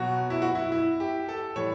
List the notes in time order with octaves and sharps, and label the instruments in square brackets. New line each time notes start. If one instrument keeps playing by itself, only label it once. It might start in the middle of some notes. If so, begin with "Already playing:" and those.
Already playing: [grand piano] B2 F#3 F#4
E4
F#4
E4
E4
G4
A4
A2 E3 G3 C#5